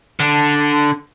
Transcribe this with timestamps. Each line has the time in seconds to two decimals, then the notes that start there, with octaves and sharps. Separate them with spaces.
0.20 D3